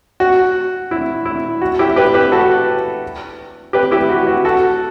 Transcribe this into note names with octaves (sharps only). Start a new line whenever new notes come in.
F#4
E4
E4
F#4
E4 G4
G4 B4
G4 B4
F#4 A4
G4 B4
E4 G4
F#4
F#4
F#4 A4